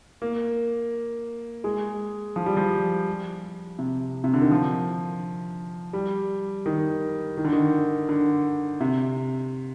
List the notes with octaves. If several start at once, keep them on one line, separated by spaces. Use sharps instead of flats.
A#3
G#3
F3
G3
F3
C3
C3
D3
D#3
F3
G3
D#3
D#3
D3
D#3
D3
C3